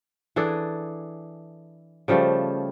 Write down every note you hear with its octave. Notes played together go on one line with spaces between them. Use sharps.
E3 D4 G#4 A4
C#3 F3 G3 A3